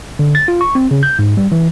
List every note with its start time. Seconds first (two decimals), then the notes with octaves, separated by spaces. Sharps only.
0.19 D3
0.35 A6
0.48 F4
0.61 C#6
0.75 C4
0.91 C#3
1.03 G6
1.19 G#2
1.37 G3
1.52 E3